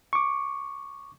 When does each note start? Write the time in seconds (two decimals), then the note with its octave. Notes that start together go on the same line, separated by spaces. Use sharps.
0.13 C#6 D6